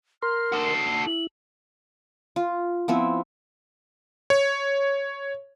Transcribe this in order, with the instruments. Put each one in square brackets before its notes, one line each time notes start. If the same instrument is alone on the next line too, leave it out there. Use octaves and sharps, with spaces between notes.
[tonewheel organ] A#4 C6 [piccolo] F6
[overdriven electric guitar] F#4 A4
[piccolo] C7
[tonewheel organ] E4 [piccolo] F#7
[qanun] F4
F3 B3 C4 E4
[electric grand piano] C#5